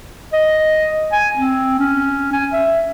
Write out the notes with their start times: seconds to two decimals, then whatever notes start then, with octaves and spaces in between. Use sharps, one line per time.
0.33 D#5
1.12 G#5
1.37 C4
1.79 C#4
2.33 G#5
2.53 E5